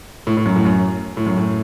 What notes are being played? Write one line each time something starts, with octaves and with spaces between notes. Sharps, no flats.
A2
A2
F#2
A2
F#2
A2
F#2
A2